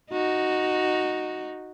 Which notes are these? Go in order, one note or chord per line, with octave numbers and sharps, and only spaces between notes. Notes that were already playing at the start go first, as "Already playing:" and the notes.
D#4 F#4